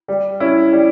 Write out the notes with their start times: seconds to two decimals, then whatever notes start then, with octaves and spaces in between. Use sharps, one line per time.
0.08 G3
0.40 C#4 E4
0.73 G3